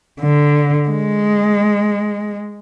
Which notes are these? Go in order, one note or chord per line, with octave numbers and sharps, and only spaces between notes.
D3
G#3